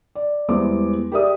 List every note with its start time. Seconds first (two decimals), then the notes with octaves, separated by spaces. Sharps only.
0.15 D5
0.49 E2 E3 G3 G#3 C5 D6
1.12 G4 G#4 A#4 D5 E5 D#6